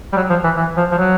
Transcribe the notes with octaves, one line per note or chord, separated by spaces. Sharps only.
G3
F#3
F3
E3
E3
F3
F3
F#3